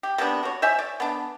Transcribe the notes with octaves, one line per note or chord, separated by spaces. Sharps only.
G4
C3 G3 B3 D4
F#4 C#5
C5 C#5 E5 G#5
D5
B3 D4